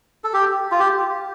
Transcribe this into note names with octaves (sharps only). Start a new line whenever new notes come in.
A4
G4
F4
G4